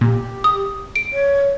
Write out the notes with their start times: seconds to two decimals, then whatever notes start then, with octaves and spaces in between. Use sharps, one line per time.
0.01 A#2 G4
0.44 D#6
0.96 D7
1.13 C#5